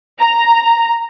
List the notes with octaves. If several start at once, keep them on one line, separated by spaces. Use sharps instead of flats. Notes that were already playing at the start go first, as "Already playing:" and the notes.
A#5